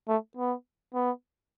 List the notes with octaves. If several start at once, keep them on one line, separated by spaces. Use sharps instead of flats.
A3
B3
B3